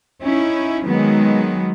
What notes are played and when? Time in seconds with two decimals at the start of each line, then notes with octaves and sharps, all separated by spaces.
0.23 C#4 D#4 E4
0.84 D#3 F#3 G#3 B3